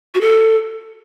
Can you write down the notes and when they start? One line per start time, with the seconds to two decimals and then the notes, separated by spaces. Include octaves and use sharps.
0.15 F#4
0.21 A4